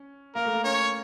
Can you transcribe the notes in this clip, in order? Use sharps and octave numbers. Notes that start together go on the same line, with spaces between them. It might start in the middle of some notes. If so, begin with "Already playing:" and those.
Already playing: C#4
A#3 A#4
A3
A#3
C#4 C#5